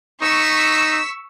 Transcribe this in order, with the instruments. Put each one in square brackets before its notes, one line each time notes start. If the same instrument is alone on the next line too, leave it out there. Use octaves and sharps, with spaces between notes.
[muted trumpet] D#4 [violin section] C#6 E6 B6